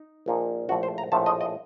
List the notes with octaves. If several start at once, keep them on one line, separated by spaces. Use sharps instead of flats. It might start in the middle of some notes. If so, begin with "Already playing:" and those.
Already playing: D#4
A#1 A#2 F3 A#3 D#4
A#1 A2 F3 A3 F#4
C5
A#5
A#1 A2 F3 A3 A5
D#5
D#5